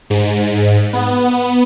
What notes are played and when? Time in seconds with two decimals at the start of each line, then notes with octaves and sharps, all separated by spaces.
0.10 G#2
0.93 B3